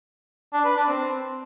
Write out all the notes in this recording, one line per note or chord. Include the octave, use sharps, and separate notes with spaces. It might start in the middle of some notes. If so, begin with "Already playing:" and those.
D4
B4
D4
C4